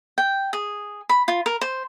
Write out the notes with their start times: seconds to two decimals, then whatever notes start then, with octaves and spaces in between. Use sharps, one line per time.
0.18 G5
0.53 G#4
1.09 B5
1.28 F4
1.46 A#4
1.61 C5